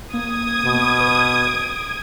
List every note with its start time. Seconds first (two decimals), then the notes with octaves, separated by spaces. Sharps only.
0.13 A#3 D#6 G#6
0.64 B2
1.00 B4
1.47 D7